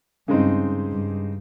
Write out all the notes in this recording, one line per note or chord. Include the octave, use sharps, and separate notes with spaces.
G2 C#3 G#3 C4 D#4
G2